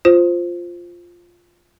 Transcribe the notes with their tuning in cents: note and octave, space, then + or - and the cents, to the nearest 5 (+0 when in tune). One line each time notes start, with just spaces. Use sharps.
F4 +0 C5 +0